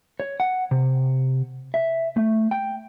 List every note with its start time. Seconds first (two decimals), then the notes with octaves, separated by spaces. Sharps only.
0.20 C#5
0.40 F#5
0.71 C3
1.74 E5
2.17 A3
2.51 G5